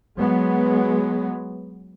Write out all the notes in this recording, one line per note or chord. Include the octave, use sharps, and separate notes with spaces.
F#3 G#3 B3